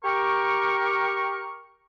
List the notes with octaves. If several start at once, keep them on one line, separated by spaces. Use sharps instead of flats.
G4 A#4 C#6